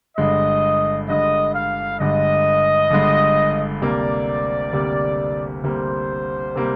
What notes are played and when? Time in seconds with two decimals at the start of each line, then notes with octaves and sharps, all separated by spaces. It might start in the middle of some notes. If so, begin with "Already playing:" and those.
0.17 G1 G2 D3 G#3 D#5
1.09 G1 G2 D3 G#3 D#5
1.55 F5
2.00 G1 G2 D3 G#3 D#5
2.90 G1 G2 D3 G#3
3.82 D2 C3 G3 A#3 D5
4.72 D2 C3 G3 A#3
5.63 D2 C3 G3 A#3 C5
6.56 C3 G3 A#3